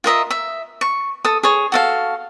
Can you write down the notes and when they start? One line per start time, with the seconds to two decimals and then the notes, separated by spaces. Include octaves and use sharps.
0.04 F4 A#4 D#5 E5
0.30 E5
0.81 C#6
1.25 A4 D#6
1.43 G#4 C#5
1.72 F#4 A4 F5